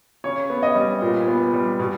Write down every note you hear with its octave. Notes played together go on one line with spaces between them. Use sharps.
C#3 C#5
B3
D#5
G3
A#2
B3
G3
B2